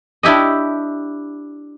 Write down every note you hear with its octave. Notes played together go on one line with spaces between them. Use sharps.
D4 E4 G4 D#5